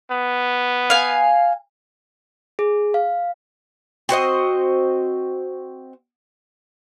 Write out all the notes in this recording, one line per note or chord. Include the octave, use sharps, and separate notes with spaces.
B3
F5 G#5
G#4
F5
C4 F#4 C5 D#5